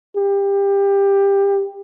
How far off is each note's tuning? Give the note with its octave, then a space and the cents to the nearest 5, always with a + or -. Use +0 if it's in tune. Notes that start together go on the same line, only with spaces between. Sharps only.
G4 +20